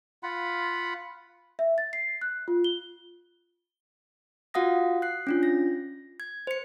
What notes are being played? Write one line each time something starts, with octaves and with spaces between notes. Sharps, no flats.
F4 F#5 B5
E5
A6
C7
F#6
F4
G7
F4 F#4 F5 F#5 D#6 A#6
F#6 C7
C#4 D4 F4
A#6
G#6
C5 C#7